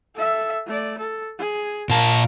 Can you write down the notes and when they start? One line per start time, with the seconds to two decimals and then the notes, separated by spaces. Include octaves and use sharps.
0.15 A4 E5
0.66 A3 D5
0.98 A4
1.39 G#4
1.89 A#2 A#4 F5 A5